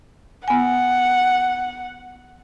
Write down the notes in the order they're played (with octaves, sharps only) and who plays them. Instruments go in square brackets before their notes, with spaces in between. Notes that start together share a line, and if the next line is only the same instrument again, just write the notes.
[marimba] B3 G#5 [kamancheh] F#5